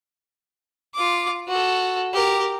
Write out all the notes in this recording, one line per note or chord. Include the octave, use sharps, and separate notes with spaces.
F4 D6
F#4 A4
G4 A#4